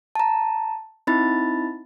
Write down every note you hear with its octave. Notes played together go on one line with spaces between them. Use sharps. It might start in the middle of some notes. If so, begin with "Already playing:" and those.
A5 A#5
C4 D#4 E4 B5 A6